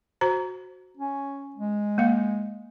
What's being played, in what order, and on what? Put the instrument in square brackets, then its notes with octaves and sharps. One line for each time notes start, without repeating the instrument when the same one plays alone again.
[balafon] F#4 C5 A#5
[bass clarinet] C#4
G#3
[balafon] A#3 F5